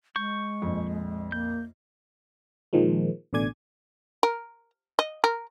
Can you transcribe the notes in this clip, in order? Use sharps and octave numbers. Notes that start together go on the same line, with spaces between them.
G#3 C#6 G6
A#1 F2
A#3 G6
A#2 D#3 F3 G#3
A1 B2 D3 D5 G#5 G#6
A#4
D#5
A#4